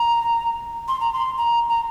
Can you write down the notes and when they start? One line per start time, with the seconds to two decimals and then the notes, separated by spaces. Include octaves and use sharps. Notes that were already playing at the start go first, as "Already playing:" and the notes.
Already playing: A#5
0.88 C6
1.00 A#5
1.13 C6
1.37 A#5
1.69 A#5